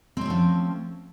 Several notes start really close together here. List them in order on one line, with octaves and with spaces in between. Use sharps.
C4 C#4 A3 F3